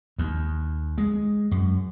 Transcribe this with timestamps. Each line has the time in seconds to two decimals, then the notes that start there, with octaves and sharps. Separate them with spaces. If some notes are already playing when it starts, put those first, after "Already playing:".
0.18 D#2
0.98 G#3
1.51 F#2